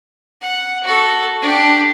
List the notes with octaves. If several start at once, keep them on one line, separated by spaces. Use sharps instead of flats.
F#5
F#4 A4
D4 G4